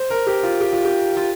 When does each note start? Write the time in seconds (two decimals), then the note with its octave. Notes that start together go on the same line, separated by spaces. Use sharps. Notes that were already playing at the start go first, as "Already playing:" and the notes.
Already playing: C5
0.10 A#4
0.27 G4
0.43 F4
0.61 G4
0.72 F4
0.85 G4
1.17 F4